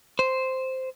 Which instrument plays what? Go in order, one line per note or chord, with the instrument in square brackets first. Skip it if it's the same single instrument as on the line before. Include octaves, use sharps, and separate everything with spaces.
[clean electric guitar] C5